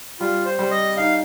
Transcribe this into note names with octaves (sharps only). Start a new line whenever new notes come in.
G3 F4
C5
G3
D#5
D#4 F5